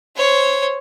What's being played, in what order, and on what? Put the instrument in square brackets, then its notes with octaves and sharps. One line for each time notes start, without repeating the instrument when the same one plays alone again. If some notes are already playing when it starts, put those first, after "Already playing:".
[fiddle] C5 C#5